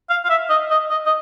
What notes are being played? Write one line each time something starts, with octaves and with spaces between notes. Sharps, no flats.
F5
F5
E5
D#5
D#5
D#5
D#5